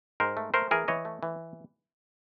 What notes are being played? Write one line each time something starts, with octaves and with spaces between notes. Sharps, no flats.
G#2 A#4 C5
A3
A3 A#4 C5
E3 G#4 A#4
E3 C#5 D#5
A3
E3